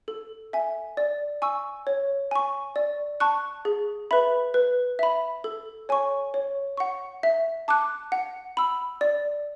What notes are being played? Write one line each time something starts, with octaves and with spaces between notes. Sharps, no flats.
A4
E5 G#5
D5
G#5 C#6 E6
C#5
G#5 C#6
D5
A5 C#6 F#6
G#4
B4 E5 B5
B4
E5 B5
A4
C#5 G#5 C#6
C#5
F#5 C#6
E5
A5 D6 F#6
F#5
B5 E6
D5